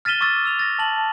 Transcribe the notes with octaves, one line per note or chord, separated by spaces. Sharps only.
F6 A6 B6 D#7 E7 G7
C#6 D6 E6 A6
E6 F7
A6 A#6
A5 F#7
A5